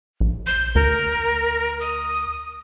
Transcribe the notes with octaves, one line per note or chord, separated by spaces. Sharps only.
A#1
G6
D2 A#4
D#6